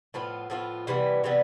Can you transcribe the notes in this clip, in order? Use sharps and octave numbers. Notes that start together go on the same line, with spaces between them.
A2 F3 B3 F4
A2 F3 B3 F4
C3 E3 G3 B3
C3 E3 G3 B3